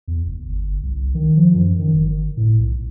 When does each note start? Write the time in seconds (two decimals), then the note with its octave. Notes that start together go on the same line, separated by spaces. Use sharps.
0.08 E2
0.26 F1
0.43 G1
0.83 C2
1.15 D#3
1.37 F3
1.55 F#2
1.79 D#3
1.93 G1
2.37 A2
2.59 B1